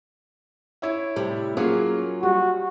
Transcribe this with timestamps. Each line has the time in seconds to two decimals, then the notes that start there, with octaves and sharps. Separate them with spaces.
0.82 E4 C#5 E5
1.16 A2 C3 G3
1.57 F#3 A#3 C#4 F4 G#4
2.23 G3 F#4